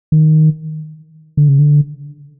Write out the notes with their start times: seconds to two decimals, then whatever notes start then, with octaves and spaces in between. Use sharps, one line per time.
0.12 D#3
1.37 D3
1.48 C#3
1.59 D3